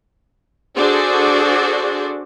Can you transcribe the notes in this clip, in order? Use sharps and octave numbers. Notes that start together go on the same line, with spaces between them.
D4 F#4 G#4 A4 C5 D5